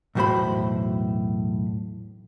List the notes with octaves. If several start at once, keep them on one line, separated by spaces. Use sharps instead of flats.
B1 E2 A2 F#4 C5 B5